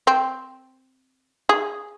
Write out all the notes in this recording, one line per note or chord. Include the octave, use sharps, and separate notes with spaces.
C4
G#4